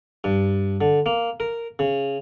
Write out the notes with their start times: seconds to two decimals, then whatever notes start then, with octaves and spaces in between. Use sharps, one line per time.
0.24 G2
0.81 D3
1.06 A#3
1.40 A#4
1.79 C#3